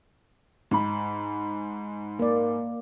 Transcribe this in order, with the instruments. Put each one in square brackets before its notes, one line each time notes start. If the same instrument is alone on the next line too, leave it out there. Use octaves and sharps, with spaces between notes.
[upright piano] G#2 B5
[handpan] A#3 D5